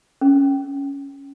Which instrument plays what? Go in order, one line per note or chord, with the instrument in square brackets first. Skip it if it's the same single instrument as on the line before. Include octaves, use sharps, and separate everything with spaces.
[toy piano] C#4